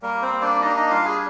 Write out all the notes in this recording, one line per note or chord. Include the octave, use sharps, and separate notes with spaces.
G3 A#3 A#4
C4 C5
A#3
D4 D5
D4 D#4 D#5
D#4 D#5
G3 F4 F5
G#4 G#5